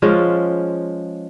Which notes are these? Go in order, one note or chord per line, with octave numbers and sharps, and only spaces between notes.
F3 G#3 C#4 F4